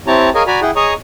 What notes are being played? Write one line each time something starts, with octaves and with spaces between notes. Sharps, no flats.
C4 E4 G4 C#5 A5 A#5
G#4 A#4 C#5 D#5 F5 G#5
F#4 D5 G#5 A#5 B5
E4 G#4 F#5 G5
G#4 C#5 D#5 A#5 C#6 D#6